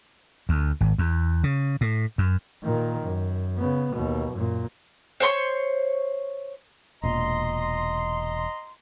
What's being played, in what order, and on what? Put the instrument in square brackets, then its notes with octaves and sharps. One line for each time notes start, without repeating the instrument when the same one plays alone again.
[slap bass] D2
G#1
E2
C#3
A2
F#2
[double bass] A#2 D#3
F#2
C#3 B3
D#2 B2
F#2 A#2
[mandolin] C5 C#5 C6 C#6
[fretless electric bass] E1 A#2 [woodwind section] D#5 A#5 C6